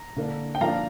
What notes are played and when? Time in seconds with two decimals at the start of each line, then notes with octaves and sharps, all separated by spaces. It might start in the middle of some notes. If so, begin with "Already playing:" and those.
Already playing: A#5
0.17 D3 A#3 D4
0.55 G5
0.61 F3 A#3 D4 F5 A#5